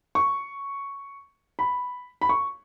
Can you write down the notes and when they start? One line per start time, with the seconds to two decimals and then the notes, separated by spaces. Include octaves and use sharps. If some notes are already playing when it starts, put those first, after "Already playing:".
0.15 C#6
1.59 B5
2.21 B5
2.29 C#6